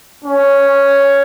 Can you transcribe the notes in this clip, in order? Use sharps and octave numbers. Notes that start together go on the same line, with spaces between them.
C#4